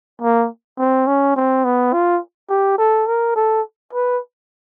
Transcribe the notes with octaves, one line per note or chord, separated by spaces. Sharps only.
A#3
C4
C#4
C4
B3
F4
G4
A4
A#4
A4
B4